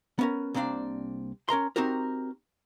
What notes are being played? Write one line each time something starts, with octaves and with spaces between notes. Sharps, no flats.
B3 C#4 A#4
C2 A#3 C4 D4 D5
C#4 A#4 A#5 C6
C4 D#4 F#4 G4 A#4